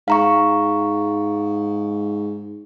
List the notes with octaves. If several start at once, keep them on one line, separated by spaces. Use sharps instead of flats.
G#2 F5 A#5 C#6